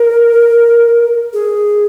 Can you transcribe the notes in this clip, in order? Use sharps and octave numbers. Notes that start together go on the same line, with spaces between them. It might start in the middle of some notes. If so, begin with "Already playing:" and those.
Already playing: A#4
G#4